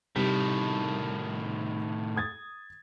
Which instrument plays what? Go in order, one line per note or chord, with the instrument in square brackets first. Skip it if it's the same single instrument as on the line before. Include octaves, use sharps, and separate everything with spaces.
[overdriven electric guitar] A2 D#3 [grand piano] C3 G3 B6
[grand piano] D#6 G#6 A6